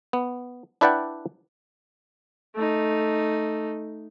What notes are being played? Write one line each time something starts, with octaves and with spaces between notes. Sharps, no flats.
B3
D4 E4 B4 D5 F#5 G5
A3 D#4